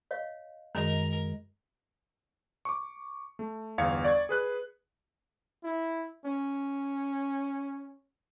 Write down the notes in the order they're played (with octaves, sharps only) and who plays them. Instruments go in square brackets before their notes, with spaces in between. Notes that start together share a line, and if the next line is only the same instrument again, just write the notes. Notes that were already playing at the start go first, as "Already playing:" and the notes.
[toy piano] C#5 D#5 F5
[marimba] F#2 D#3 [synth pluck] G#3 [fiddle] A#4 [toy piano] D#5 A#5
[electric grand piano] C#6 D6
A3
G1 E2 F5 G#6 C#7
D5 C#6 G#6
G#4 B4 F#6
[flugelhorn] E4
C#4